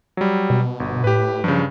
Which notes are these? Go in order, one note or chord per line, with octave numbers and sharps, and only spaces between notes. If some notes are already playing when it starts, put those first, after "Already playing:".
F#3 G3
B2
G1
A2 G4 B4
G2 C#3 F3